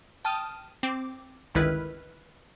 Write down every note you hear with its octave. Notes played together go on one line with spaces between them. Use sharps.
G5 A5 D#6 F6 D#7
C4 D6
G1 C#2 D#3 E4 B4 F6